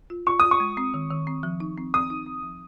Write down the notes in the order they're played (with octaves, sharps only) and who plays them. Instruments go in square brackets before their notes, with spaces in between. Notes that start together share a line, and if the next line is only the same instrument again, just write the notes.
[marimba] F4
[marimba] F4 [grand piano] C#6
[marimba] F4 [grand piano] D#6
[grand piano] C#6
[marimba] G#3
C4
D#3
D#3
C4
F3
D#4
C4
[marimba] C4 [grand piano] D#6
[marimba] D#4
C4
F3